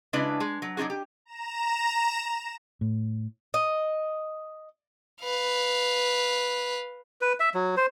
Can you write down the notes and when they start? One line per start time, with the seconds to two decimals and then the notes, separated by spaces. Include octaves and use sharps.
0.13 C#3 G#3 D4 E4 B4 D5
0.40 G#3
0.62 F#3
0.77 F#3 D4 D#4 F#4 G#4
0.90 G4
1.25 A#5 E7
2.81 A2
3.54 D#5
5.23 B4 F5
7.21 B4
7.40 E5
7.54 F#3
7.77 C5